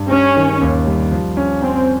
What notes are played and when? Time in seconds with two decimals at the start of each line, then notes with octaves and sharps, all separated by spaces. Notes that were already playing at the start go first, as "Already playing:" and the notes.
Already playing: G2
0.10 G3 C#4
0.36 D#3
0.61 D#2
0.87 G3
1.11 F3
1.37 C#4
1.62 C4 C#4